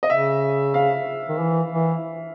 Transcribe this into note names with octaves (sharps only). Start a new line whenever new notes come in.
D#5
C#3 E5
F5
D#3
E3
E3